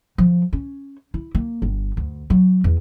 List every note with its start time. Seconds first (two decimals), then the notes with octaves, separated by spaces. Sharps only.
0.18 F3
0.53 C#4
1.14 E4
1.35 A#3
1.62 G1
1.97 D2
2.30 F#3
2.64 E2